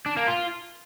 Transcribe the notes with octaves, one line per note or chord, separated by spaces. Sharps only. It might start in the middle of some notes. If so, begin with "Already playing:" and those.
D4
A#3
F4